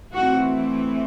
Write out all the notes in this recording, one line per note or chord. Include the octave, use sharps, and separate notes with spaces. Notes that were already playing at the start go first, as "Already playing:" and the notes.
E3 A3 C4 F#4